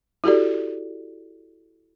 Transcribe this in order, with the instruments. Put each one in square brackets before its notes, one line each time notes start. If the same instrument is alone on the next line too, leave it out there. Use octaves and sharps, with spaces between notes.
[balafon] E4 F#4 G4 A4 D5